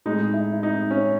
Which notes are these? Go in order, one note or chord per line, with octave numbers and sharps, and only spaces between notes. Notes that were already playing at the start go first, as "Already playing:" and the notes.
A2 G#3 D#4
E4
E4
D#4
C#4